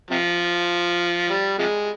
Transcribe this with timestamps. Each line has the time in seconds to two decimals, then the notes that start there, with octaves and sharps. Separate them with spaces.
0.10 C3 F3
1.30 G3
1.59 C3 F3 G#3